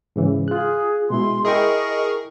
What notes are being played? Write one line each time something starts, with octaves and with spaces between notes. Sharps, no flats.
G#2 C#3 E3
F4 G#4 F#6
B2 G#3 E4 C6
E4 G#4 A#4 D#5 G5 C#6